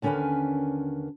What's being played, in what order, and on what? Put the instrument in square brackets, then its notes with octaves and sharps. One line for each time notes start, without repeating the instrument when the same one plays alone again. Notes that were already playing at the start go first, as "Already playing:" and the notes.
[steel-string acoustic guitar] D#2 D3 C#4 A#4 B4 G#5